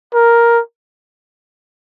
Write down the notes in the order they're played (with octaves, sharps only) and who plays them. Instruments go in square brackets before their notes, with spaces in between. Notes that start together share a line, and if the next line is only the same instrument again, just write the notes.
[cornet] A#4